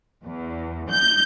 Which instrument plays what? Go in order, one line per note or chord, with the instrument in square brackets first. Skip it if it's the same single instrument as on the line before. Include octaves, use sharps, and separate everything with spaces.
[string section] E2
G6